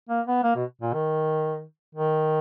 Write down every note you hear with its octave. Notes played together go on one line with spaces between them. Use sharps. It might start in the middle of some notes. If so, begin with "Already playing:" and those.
A#3
B3
A#3
B2
A#2
D#3
D#3